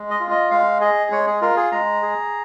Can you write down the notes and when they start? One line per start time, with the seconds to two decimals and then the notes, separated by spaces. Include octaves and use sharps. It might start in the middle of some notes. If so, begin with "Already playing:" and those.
Already playing: G#3
0.11 D#5
0.20 F4
0.31 D#5
0.51 G#3 F5
0.81 G#4 D#5
1.11 G#3 C#5
1.27 G#4
1.41 F4 A#4
1.57 G#4
1.72 G#3 A#5
2.02 G#4